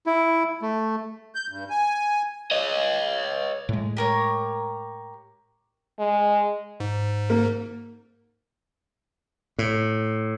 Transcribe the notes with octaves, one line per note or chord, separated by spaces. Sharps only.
E4
A3
G6
G2
G#5
C#5 D#5
A2 G#3
G4 A#4 C#5
G#3
G#2
A#3
A2